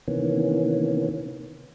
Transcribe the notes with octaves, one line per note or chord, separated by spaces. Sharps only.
C3 D#3 E3 A#3 B3 C#4